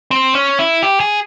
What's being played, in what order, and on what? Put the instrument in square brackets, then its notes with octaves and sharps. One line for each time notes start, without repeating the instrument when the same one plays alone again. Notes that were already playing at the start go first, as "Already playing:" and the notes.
[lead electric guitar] C4
C#4
E4
G4
G#4